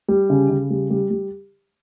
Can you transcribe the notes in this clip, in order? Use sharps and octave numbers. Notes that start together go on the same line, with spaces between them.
G3
C#3
C#3
G3
G3
G3